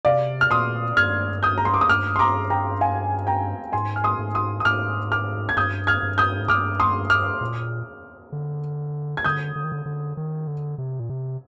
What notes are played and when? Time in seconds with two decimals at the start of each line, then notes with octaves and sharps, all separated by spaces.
0.05 C3 D5 F5
0.41 F6
0.51 A#2 C6 D#6
0.97 G2 F6 G#6
1.43 D#6 G6
1.58 A#5
1.65 C6
1.74 D6
1.81 D#6
1.89 G2 D6 F6
2.16 C6
2.19 A#5 D6
2.50 G5 A#5
2.81 F5 G#5
3.27 G5 A#5
3.73 G#2 G#5 C6
3.96 F6
4.04 C6 D#6
4.19 G#2
4.35 C6 D#6
4.60 D#6
4.65 G#2 D6 F6
5.12 D6 F6
5.49 G#6
5.57 G2 D#6 G6
5.87 F6 G#6
6.03 G2
6.18 D#6 G6
6.39 G#2
6.48 G2 D6 F6
6.80 C6 D#6
7.10 D6 F6
7.41 A#2
8.32 D3
9.17 G#6
9.24 D3 D#6 G6
9.56 D3
9.64 D#3
9.72 D3
9.86 D3
10.17 D#3
10.47 D3
10.78 C3
11.00 A#2
11.09 C3